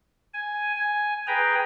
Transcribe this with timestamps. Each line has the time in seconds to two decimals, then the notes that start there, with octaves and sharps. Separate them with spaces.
0.34 G#5
0.76 G#5
1.27 G#4 B4 G5 A#5